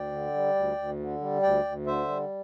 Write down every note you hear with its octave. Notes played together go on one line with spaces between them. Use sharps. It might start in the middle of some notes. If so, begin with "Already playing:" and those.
Already playing: D2 D5 G5
D3
G3
D2
D2
D3
G3
D2 D5 G5
D2
D3 C5 E5
G3